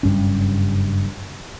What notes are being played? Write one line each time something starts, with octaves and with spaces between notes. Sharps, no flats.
F#1 G2 C#4